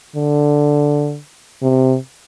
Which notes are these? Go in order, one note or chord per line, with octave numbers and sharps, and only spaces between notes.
D3
C3